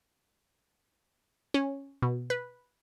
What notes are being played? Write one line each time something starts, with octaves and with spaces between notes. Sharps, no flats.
C#4
B2
B4